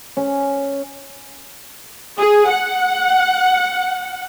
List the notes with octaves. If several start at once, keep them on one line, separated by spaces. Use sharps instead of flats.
C#4
G#4
F#5